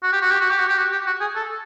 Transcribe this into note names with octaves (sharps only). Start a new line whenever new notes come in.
F#4
G4
F#4
G4
F#4
G4
F#4
G4
F#4
G4
F#4
G#4
A4